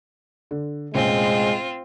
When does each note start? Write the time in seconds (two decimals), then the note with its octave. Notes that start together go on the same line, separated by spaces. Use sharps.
0.51 D3
0.94 F1 A#1 G#3 C4 C#4 F4